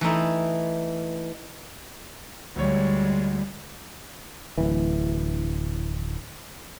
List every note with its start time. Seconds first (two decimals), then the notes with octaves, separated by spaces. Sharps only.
0.01 E3 A3 D#4 E4
2.56 D2 G3 G#3 C#5
4.58 D1 E3